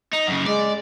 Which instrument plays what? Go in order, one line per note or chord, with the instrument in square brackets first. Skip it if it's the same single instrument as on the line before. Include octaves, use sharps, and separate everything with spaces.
[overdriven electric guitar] D#4
F#2 C#3
[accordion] G#3 [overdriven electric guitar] D5